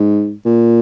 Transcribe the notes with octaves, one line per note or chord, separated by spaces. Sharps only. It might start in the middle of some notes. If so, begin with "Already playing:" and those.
Already playing: G#2
A#2